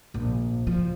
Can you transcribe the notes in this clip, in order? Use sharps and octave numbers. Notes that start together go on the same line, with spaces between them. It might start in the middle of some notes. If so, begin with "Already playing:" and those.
A#1
F3